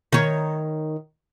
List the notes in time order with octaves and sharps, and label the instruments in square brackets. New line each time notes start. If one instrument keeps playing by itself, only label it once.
[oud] D#3 C#5